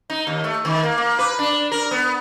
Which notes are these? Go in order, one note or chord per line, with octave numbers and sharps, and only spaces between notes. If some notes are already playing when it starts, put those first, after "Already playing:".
D#4
D#2
A3
D#3
A#3
A#3
B4
D4
A#4
B3